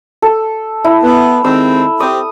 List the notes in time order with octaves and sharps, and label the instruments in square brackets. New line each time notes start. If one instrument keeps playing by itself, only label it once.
[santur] A4
E4
[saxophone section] B3
[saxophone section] D#3 G#3 C4 [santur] E6
[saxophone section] C4 G4 [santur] D#6